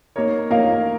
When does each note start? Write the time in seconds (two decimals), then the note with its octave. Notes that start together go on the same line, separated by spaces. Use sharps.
0.16 A#3 D#4 A#4 C#5
0.51 A#3 D#4 A#4 C#5 F5